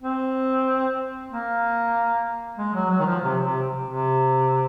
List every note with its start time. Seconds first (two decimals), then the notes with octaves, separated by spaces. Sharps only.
0.02 C4
1.31 A#3
2.58 G#3
2.74 F#3
2.90 F#3
2.99 D#3
3.06 F3
3.23 C3
3.44 C3
3.87 C3